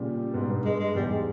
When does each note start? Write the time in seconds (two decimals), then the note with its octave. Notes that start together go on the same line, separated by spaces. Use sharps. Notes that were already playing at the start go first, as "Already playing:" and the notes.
Already playing: A#2 C#3 G3
0.33 G#2 B2
0.49 G2
0.64 G2 G#3
0.79 G#3
0.95 E2 G#2 G3
1.11 G#3